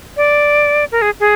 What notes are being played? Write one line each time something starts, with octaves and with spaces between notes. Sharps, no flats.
D5
A#4
G#4
G#4